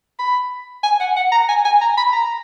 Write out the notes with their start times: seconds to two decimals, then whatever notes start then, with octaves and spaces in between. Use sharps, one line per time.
0.19 B5
0.83 G#5
1.00 F#5
1.17 F#5
1.32 A#5
1.49 G#5
1.65 G#5
1.81 A#5
1.98 B5
2.13 A#5